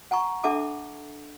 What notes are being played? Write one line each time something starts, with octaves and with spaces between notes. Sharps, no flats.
F#5 G#5 A#5 C#6
D4 A4 E5 F#5 A5 D6